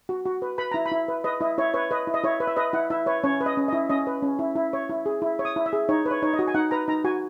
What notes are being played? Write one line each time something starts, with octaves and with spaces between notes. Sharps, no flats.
F#4
F#4
B4
B4 B5
E4 A#5
B5
E4
B4
B4 D#5
E4 D#5
E4 C#5
B4 C#5
B4 D#5
E4
D#5
E4 C#5
B4
E5
B4 D#5
E4 F#5
E4 E5
B4 C#5
C#4 C#5
B4
D#5
C#4
D#5
E4
C#4 D#5
B4
C#4
E4
E4
C#5
E4
G#4
E4
C#5
D#6
E4
E5
G#4
D#4 C#5
B4
C#5
D#4 C#5
D#5
F#4
G#5
D#4 F#5
B4 A#5
D#4 A#5
F#4 G#5